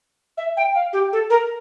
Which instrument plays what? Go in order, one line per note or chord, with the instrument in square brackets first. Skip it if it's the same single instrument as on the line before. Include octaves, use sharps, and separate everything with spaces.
[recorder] E5
G5
F5
G4
A4
A#4